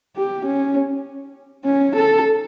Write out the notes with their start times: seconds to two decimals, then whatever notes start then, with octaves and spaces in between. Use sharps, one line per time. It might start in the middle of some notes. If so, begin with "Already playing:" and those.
0.16 G4
0.45 C#4
1.65 C#4
1.95 A4